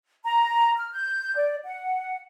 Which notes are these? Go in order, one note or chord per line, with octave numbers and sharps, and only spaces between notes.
A#5
F6
G6
D5
F#5